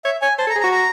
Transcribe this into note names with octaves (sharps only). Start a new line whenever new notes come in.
C#5 E5
C#5 G#5
C5 A5
A4
A#5
G#4
A#5
F#4
A#5